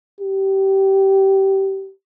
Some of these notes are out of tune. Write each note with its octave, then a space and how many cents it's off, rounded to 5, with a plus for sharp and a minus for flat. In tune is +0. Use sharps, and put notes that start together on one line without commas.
G4 -20